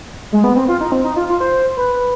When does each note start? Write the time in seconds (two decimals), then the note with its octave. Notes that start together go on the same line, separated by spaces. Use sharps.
0.32 G#3
0.44 B3
0.56 C4
0.68 F4
0.81 D#4
0.92 C4
1.04 D#4
1.16 F4
1.29 F4
1.40 C5
1.77 B4